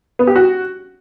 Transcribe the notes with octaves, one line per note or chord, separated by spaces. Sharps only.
B3
G4
F#4